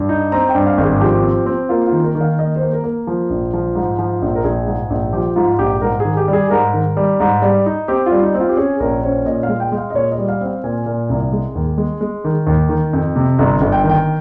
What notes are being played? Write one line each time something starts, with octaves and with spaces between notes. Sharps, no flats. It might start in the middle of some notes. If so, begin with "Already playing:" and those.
Already playing: G2
D#4
C4 A#5
G5
G2
F5
G#1
G#4
F3 G4
C4
C4
A#3 F4
F4
D#3
A#4
D#3
F5
A#3 D#5
C5
A#3
A#4
A#3
F3
A#1
F3
G#2
F3
A#1
A#4
A#1 G#4
G#2
A#1
F3 G4
G#2 F4
A#1 G4
G#2 A#4
D#3 G#4
G4
G3
G#4
G#2 A#4
D#3
G3
G#2
G3
D#4
C4 G4
F4
G3
D#4
C4
F4
G4
C#4 G#4
A#1 A#4
C#4 C5
A#2 D#5
F5
G#3
G5
G#3
F5
D#5
A#2 C#5
D#5
G3
F5
C4
F5
A#2 G#5
A#2
C2
G#3
D#2
G#3
G#3
D#3
D#2
D#3
F2
C3
G1 A#5
G1
G5
D#3
G5